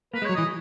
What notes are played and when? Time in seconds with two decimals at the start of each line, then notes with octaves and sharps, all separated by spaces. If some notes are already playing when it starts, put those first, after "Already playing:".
0.14 A#3 B4
0.22 G#3
0.25 F#3 C#5
0.35 E3 D#5